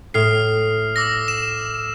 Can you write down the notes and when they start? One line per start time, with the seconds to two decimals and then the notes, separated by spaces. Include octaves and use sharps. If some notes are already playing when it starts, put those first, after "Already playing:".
0.14 A2 D#6 F6 C7
0.96 D6 E6 A#6
1.28 E7